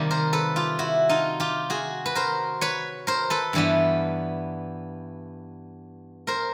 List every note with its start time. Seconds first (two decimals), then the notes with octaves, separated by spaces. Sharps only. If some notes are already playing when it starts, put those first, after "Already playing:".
Already playing: C3 D#3 G3 A#3
0.11 A#4 C5
0.33 A4 B4
0.56 F4 G4
0.79 E4 F#4
1.09 D#4 F4
1.40 F4 G4
1.70 F#4 G#4
2.06 B4
2.15 A#4 C5
2.61 B4 C#5
3.07 A#4 C5
3.30 A4 B4
3.53 G2 E3 G3 B3
6.27 A#4 C5